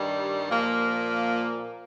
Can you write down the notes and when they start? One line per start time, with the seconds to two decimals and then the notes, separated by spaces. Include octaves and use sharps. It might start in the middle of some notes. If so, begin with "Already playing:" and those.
Already playing: G2 D#3 G3
0.50 A#2 F3 A#3